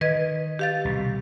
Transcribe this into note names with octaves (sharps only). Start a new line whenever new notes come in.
D#3 B4 D#5 G#6
G4 F5 A6
C2 B2